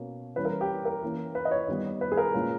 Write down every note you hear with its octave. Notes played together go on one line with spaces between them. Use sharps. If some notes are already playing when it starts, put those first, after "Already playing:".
Already playing: B2 A#3 C#4
E3 G3 C#4 B4
A#4
G4
A#4
E3 A#3 C#4
B4
D#5
C#5
D#3 G3 B3
B4
G#4
A#4
A#2 G#3 C#4